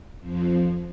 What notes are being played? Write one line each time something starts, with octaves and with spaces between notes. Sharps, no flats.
F2 F3